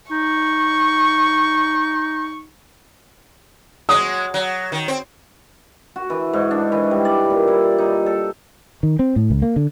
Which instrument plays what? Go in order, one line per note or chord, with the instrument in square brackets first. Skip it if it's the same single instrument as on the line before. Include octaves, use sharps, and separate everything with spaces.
[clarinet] D#4 [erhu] C#6
[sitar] F#3 G#3 [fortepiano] D#6
[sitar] F#3
D#3
C4
[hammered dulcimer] F#4
E3
G#2
D4
E3
G3
D5
A#2
E4
D#4
A4
[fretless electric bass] D#3
C4
A2
C#2
A#3
D3